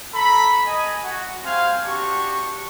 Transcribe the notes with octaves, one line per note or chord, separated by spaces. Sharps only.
A4 A#5 B5
D#5 G#5
F#4
G3 C4 F5 G#5 C6
D4 F#4 G4 C#6